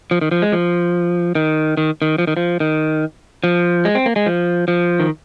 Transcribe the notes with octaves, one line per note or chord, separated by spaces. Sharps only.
F3
D#3
F3
G#3
F3
D#3
D#3
D#3
F3
D#3
F3
D#3
F3
G#3
C4
A#3
G#3
F3
F3
D#3